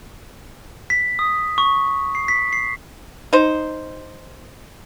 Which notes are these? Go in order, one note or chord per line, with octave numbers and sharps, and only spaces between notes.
B6
D#6
C#6
C7
B6
C7
D#4 C5